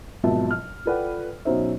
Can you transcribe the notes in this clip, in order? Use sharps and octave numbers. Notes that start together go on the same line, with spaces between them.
G#1 B2 F3 F#3 E5 A5
F6
F4 A4 B4 D5 F#5 G5
B2 F#3 C#4 D#4 C5 E5